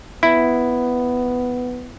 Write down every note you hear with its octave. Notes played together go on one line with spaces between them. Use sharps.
B3 E4